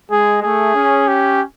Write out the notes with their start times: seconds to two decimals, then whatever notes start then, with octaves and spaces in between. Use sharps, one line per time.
0.11 G#3 G#4
0.43 A3 G#4
0.75 C#4
1.08 G4